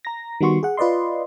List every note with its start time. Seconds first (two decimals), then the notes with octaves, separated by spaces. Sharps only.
0.05 A#5 A#6
0.41 D#3 G3 B3 F#4 C6 C#6
0.63 G#4 F#5
0.77 F4 B4 D5 D#5 C6